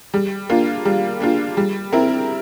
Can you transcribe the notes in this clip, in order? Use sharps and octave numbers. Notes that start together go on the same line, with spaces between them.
G3
A#3 D4 F4
G3
A#3 D4 F4
G3
C4 E4 A#4